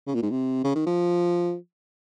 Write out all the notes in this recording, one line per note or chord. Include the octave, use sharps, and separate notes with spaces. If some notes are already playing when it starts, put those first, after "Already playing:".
C#3
A#2
G#2
C3
C#3
D#3
F3